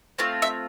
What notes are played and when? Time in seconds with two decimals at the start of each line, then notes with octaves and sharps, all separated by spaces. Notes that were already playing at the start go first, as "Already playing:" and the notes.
0.19 A3 C4 F4
0.42 E5